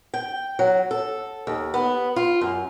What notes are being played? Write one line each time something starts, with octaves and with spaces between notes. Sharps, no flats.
G5
F#3
A4
D#2
B3
F4
F#2